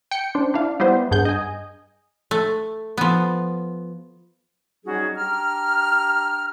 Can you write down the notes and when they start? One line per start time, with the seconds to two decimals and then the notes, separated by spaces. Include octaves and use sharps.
0.11 G5 C#7
0.35 C#4 D4 C5
0.54 D4 E4 F5
0.80 G3 B3 E4 C5
1.11 G2 G#4 F#5 G6
1.25 D#5 G#5
2.31 A3
2.97 F3 B3
4.85 F#3 G3 C#4 D#4 F#4 G#4
5.16 D4 G4 A#5 F6